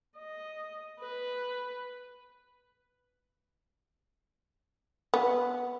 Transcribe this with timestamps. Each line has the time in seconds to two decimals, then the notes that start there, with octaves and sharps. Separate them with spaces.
0.17 D#5
1.00 B4
5.14 B3